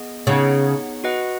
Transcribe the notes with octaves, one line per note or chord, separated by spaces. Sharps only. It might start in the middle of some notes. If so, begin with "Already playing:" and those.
Already playing: B3 G#4 D#5
C#3 B3 D#4 G#4 C#5 F#5
F#4 B4 D#5 F#5